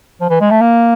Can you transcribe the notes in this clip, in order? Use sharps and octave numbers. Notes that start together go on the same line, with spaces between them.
F3
E3
G#3
A3
A#3